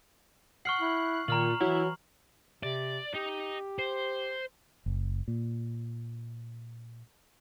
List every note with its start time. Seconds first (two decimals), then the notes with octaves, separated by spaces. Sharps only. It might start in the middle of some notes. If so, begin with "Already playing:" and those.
0.65 F#5 C#6 F6 F#6 C7
0.81 E4
1.28 A#2 D#3 A#5 F6 F#7
1.61 E3 F#3 E4
2.63 C3 D5
3.15 D#4 G4
3.79 C5
4.86 F#1
5.28 A#2